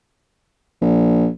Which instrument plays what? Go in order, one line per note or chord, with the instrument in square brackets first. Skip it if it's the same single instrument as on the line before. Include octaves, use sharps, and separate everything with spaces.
[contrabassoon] A#1